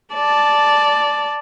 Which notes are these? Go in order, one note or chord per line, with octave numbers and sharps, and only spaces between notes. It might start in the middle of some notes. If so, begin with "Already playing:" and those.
D5 A5